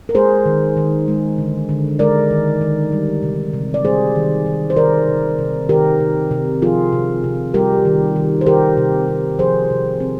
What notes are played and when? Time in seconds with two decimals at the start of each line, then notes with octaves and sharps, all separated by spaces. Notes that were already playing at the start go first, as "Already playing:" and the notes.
0.09 A#4
0.15 G#3 G#4 C5
0.46 D#3
0.77 D#3
1.08 G#3
1.38 D3
1.69 D3
1.99 G#3 A#4 D5
2.31 D#3
2.61 D#3
2.92 G3
3.23 C3
3.53 C3
3.74 D5
3.85 G3 G#4 C5
4.15 D#3
4.46 D#3
4.70 C5
4.77 D#3 A#4 D5
5.08 C3
5.39 C3
5.69 D#3 G4 A#4
6.00 C3
6.31 C3
6.62 F3 F4 G#4
6.93 C3
7.24 C3
7.54 G3 G4 A#4
7.85 D#3
8.16 D#3
8.41 C5
8.47 D#3 G4 A#4
8.77 C3
9.08 C3
9.39 F3 G#4 C5
9.70 C3
10.00 C4